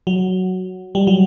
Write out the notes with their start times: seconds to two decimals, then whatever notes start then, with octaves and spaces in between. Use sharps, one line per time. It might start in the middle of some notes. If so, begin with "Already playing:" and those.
0.07 F#3
0.95 G3
1.07 F#3